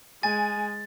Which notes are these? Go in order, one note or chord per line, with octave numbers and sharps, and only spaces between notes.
G#3 G#5 A6